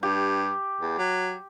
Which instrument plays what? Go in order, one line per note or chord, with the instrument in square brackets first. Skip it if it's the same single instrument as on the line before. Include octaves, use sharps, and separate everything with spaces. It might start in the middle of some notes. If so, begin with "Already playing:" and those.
[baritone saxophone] G2 [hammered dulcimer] G4
[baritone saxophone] E2
F#3